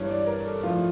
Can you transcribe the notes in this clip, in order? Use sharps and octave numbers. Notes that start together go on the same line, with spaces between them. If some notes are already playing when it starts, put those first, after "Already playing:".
Already playing: G2 E3 G3 C#5
D5
A#4
A4
A2 F3 A3 F4